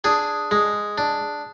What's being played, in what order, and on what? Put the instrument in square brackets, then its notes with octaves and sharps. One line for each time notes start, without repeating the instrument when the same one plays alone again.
[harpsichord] D4 G#4
G#3
D4